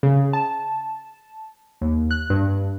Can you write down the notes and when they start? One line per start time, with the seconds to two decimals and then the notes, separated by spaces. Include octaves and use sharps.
0.03 C#3
0.33 A5
1.81 D#2
2.11 F#6
2.30 G2